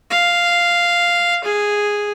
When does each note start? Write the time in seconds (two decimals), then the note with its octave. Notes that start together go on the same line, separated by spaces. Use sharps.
0.10 F5
1.44 G#4